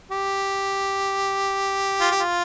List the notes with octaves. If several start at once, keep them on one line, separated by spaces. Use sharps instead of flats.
G4
F4
G4
F4